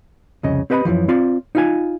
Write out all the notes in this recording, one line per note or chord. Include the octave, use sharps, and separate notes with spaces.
C2 F2 C#3 D#5
C4 G4 B4 D#5 G5 B5
F#2 A#2 E3 F3
C4 F4 D5 C6
D#4 F4 G#5